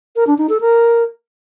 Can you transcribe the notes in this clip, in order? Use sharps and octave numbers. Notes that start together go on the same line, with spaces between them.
A#4
D4
D#4
A4
A#4